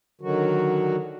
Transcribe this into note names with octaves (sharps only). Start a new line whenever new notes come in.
D3 D#3 F#3 F#4